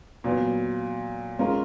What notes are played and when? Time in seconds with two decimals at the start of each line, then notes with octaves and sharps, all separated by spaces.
0.24 A#2 F#3 B3
1.39 G#3 C#4 F4 A#4